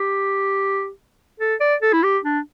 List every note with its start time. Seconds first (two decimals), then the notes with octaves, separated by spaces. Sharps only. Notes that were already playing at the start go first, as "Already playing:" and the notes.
Already playing: G4
1.40 A4
1.60 D5
1.82 A4
1.93 E4
2.03 G4
2.24 D4